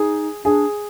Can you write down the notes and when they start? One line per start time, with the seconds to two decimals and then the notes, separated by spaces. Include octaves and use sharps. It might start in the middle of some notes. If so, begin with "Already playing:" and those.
Already playing: D#4 G#4
0.45 D4 G#4